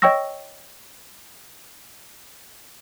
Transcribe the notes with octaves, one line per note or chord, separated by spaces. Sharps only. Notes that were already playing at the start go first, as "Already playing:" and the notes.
C#5 D#5 G5 C#6 E6 A#6